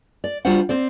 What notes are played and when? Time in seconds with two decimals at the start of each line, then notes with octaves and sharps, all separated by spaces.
0.24 D5
0.45 G3 D4 F4 F#4 C5 F#5
0.69 C4 C5 D5